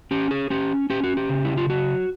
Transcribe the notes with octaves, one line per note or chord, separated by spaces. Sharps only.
C#4 G4
G#4
C#4 G4
C#4 G4
F#4
G4
C#3
E4
F4
F#3 F#4